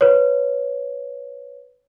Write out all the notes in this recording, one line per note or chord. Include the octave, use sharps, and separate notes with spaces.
B4 C#5